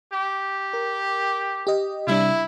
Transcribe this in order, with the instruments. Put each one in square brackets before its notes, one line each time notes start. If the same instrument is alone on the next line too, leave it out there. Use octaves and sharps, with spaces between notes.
[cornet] G4
[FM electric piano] A#4
G4 D#5
[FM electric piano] C3 G3 D4 [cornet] E4